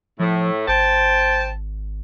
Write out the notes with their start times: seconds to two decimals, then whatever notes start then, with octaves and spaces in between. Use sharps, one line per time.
0.19 A2 F3
0.68 G#1 C5 G5 A5